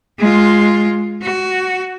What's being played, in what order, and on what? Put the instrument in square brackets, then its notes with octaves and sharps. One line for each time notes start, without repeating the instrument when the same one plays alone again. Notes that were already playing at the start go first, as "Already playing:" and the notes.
[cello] G#3 F4
F#4